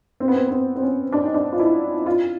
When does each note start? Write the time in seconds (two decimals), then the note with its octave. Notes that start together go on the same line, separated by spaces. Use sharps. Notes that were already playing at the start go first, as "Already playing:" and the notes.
0.20 C4
0.28 B3
0.35 C4
0.47 B3
0.51 C4
0.76 C4
0.82 C#4
1.12 D4
1.24 D#4
1.34 D4
1.52 F4
1.60 E4
2.06 F4